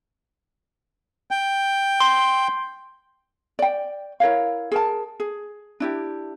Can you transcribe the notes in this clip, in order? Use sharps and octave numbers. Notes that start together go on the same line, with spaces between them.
G5
C6
D5 G5
E4 A#4 C#5 F5
G#4 A#4 A5
G#4
D4 E4 G4